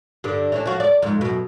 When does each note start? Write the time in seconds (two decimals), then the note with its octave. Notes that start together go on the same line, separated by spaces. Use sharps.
0.24 G2 D3
0.52 E3 C#4 D4
0.66 F3 F#4
0.80 D5
1.03 F2 G#2
1.21 F#2 B2